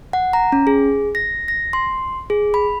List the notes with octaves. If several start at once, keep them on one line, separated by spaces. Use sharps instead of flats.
F#5
A#5
C#4
G#4
A#6
A#6
C6
G#4
B5